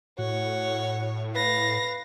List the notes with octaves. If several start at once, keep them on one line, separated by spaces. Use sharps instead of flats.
A2 F#4 C#5
B4 F5 A#6